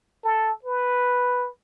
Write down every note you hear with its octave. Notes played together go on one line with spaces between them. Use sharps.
A4
B4